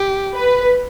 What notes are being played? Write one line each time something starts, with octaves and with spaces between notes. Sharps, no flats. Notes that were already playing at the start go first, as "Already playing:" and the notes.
Already playing: G4
B4